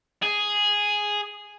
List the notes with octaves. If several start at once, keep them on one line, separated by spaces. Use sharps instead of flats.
G#4